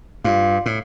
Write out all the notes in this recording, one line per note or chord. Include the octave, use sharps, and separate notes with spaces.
G2 F4
A2